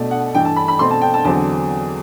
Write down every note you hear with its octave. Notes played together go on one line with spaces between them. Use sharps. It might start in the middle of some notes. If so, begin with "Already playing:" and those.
Already playing: B2 A3 D4
F#5
G2 E3 A3 G5
A5
B5
B5
B2 A3 C4 C6
A5
G5
A5
E2 D3 F#3 C4 A5